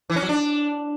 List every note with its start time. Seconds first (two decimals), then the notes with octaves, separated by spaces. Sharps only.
0.10 E3
0.16 C#4
0.22 F#3
0.29 D4